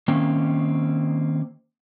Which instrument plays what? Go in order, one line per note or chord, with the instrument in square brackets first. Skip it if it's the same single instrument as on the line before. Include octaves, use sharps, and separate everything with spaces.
[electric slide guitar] D#3 A#3 C4 C#4